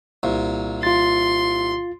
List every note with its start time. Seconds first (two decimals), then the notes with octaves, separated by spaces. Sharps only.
0.23 C2 A#2
0.83 F4 C6 A6